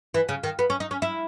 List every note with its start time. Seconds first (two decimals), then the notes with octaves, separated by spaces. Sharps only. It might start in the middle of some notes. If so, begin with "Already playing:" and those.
0.14 E3
0.29 C#3
0.43 D#3
0.59 B3
0.70 C#4
0.80 D#4
0.91 C#4
1.02 E4